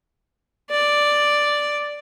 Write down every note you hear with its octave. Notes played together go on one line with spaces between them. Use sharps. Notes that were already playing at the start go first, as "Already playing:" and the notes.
D5